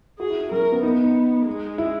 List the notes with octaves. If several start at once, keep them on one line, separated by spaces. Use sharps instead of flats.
F#4 G#4
E4
E4
F#3 A#4
A#3
B3
B3 D#4
D#4
G#3
E4